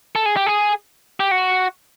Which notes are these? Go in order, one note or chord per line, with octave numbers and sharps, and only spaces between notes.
A4
G#4
G4
G#4
G4
F#4